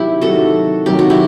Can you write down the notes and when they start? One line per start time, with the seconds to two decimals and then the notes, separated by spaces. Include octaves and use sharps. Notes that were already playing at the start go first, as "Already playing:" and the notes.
Already playing: C3 D#3 F#3 E4 G4
0.21 C3 D#3 F#3 F#4 A4
0.86 C3 D#3 F#3 G4
0.99 F#4
1.10 E4 G4